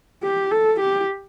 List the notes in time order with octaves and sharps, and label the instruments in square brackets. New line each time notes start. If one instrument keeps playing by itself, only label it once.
[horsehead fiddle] G4
A4
G4